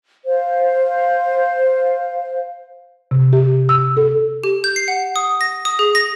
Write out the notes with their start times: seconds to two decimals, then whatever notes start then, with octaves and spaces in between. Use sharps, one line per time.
0.25 C5 F5
3.11 C3
3.33 G4
3.69 E6
3.97 A4
4.44 G4
4.64 G6
4.76 C7
4.88 F#5
5.16 D#6
5.41 A#6
5.65 D#6
5.79 G#4
5.95 A#6